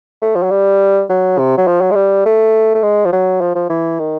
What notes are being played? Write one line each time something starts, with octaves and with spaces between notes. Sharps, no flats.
A3
F3
F#3
G3
F#3
C3
F#3
F3
F#3
G#3
G3
A3
A3
G#3
F3
F#3
F3
F3
E3
D#3